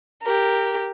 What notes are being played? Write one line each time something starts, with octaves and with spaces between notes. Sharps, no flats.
G4 A#4